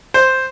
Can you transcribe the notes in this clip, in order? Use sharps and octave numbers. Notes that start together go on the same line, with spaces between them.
C5